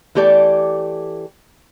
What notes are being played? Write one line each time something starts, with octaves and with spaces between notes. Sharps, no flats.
E3 A3 G4 A4 D5